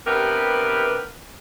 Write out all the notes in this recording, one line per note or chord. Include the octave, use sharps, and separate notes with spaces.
G2 C3 B3 G4 A#4 B4